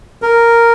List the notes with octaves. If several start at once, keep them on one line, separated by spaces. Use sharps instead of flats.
A#4